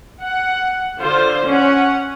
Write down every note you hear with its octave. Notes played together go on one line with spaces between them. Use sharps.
F#5
D3 F4 C5
C#4 C#5 F#5